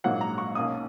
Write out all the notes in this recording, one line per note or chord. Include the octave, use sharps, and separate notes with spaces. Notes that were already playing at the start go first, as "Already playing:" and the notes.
A#1 G#2 F#3 A#3 F#5
A#5
C#6
B1 B2 A#3 C#4 D#6